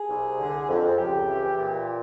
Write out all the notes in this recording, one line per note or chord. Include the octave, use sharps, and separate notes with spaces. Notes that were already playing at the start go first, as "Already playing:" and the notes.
Already playing: G#4
C2
D3
F2
C#2 G4
E3
A#2